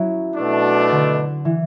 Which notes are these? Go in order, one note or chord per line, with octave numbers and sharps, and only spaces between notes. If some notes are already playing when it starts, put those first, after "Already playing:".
Already playing: F#3 C#4 E4
B2 A3 D4
D3
E3